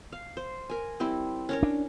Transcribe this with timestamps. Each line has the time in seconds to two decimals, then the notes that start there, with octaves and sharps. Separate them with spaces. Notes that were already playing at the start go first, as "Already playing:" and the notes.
0.12 F5
0.37 C5
0.70 A#4 G#5
1.00 G3 C4 E4
1.49 C#4 A#4 C#5
1.63 D4